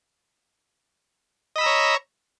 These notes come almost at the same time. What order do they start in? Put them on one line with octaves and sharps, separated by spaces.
D#5 B5 E6 A#5 C#5